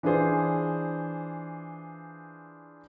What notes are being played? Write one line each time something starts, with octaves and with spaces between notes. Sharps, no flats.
E3 D4 F4 G#4 C5